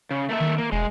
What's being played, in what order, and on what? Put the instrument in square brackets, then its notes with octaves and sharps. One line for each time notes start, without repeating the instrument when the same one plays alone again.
[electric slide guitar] C#3
A3 A#3 E5
[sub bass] D#3
[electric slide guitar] A#3
[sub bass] E1 [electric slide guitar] G#3